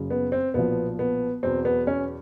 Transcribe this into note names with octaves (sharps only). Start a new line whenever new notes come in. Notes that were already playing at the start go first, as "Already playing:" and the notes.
Already playing: F#1 F#2 C#3
B3
C4
B1 A#2 F3 B3
B3
E2 B2 F#3 C4
B3
C#4